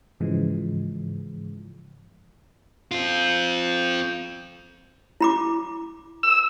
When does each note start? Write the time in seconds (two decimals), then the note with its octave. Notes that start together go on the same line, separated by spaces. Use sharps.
0.20 G#2 C#3 E3 F3 G#3
2.91 C4 F4
5.21 E4 B5 D6
6.23 E6